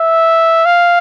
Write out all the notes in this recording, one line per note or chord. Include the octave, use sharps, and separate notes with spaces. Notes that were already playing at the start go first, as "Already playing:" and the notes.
Already playing: E5
F5